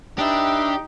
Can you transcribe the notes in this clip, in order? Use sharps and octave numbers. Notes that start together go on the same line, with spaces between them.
D4 D#4 G4 B4 E5